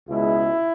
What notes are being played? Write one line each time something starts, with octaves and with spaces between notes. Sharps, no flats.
C#2 B2 G#3 E4